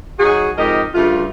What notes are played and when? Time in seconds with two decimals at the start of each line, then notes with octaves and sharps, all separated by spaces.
0.19 F#3 D#4 F#4 G#4
0.57 F2 G#2 D#4 G4 A#4 D#5
0.94 D2 G2 C#3 A3 F4